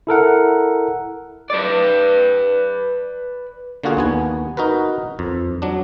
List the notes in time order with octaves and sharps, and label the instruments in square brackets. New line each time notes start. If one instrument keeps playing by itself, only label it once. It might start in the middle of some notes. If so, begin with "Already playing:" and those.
[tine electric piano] E4 A4 A#4 F#5
[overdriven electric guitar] B4 D5
[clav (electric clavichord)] D3 A#3 F4 F#4 G#4
D#2 B3 G#5
D#4 F#4 A#4 B4
F2
F#3 D4